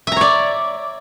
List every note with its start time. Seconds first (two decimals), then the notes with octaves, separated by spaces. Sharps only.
0.07 E5
0.12 A#5
0.16 C#5
0.21 D5